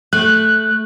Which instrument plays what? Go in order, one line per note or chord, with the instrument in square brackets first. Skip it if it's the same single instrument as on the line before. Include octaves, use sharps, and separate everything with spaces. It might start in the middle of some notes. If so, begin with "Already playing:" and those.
[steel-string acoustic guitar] A3 [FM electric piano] F#6